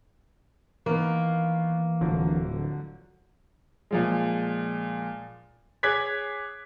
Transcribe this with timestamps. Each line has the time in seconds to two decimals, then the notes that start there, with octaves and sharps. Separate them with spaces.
0.86 D#3 E3 A#3 B3
2.01 D1 D3 F3 F#3
3.91 A#2 F3 G#3
5.83 G#4 C#5 D6 F#6 G#6 B6